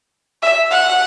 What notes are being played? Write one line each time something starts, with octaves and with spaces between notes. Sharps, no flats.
E5
F#5